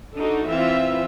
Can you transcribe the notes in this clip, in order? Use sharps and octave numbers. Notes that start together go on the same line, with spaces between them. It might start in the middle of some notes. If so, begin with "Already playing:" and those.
D4 D#4 F#4 A4
E3 C4 F4 E5